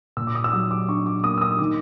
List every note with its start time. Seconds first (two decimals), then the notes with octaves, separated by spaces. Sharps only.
0.17 A#2 E6
0.27 D6
0.35 D#6
0.44 E6
0.52 F#3 D#6
0.71 D6
0.88 D4 C#6
1.06 D6
1.24 A#3 D#6
1.38 E6
1.41 D#6
1.59 D#3 D6